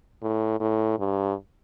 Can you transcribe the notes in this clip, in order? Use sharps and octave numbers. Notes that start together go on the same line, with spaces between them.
A2
A2
G2